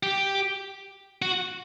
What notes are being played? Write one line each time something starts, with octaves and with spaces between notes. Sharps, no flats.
G4
F#4